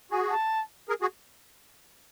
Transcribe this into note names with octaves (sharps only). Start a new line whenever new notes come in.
F#4 G#4 G#5
A5
G#4 A#4
F#4 G#4